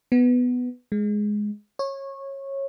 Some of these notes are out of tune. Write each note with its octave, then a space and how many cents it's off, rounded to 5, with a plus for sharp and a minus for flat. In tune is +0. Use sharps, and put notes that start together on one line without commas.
B3 +5
G#3 +5
C#5 -20